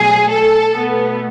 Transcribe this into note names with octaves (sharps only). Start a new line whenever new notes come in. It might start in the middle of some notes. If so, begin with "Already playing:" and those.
Already playing: B2 F#3 A3 G#4
A4
B2 A3 B3